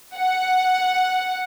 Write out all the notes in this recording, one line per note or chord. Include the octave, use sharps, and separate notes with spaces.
F#5